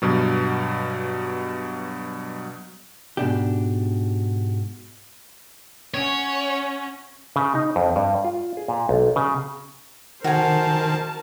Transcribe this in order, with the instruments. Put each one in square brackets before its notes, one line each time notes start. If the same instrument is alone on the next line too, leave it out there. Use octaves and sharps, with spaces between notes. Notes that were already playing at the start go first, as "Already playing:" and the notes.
[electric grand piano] G2 B2 F#3
[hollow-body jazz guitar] G#2 B2 D4 G4
[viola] C#4 F#5 [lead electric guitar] C#5
[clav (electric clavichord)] C#3
D#4
F2
G2
F4
G#4
A#2
B1
C#3
[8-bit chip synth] D#3 [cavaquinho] F#4 G#5 [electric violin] A#4 A5 [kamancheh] C5